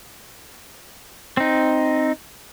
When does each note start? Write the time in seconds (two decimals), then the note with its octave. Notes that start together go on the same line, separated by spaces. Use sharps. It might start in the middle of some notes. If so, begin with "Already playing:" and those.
1.37 C4 D#4